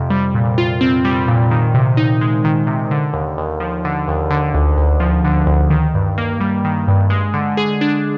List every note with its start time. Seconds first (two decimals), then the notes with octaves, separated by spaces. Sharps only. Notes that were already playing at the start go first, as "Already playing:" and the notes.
Already playing: F2 C3
0.10 G3
0.35 A#2
0.58 F4
0.81 C4
1.05 G3
1.28 A#2
1.51 D#3
1.74 C3
1.97 D#4
2.21 G#3
2.44 D#3
2.67 C3
2.91 D3
3.13 D#2
3.38 D#2
3.60 F3
3.85 D3
4.08 D#2
4.30 D3
4.54 D2
4.77 D2
5.00 F3
5.25 D3
5.47 D2
5.70 D#3
5.94 G2
6.18 A#3
6.41 G3
6.65 D#3
6.88 G2
7.10 G#3
7.34 D3
7.57 G#4
7.81 D4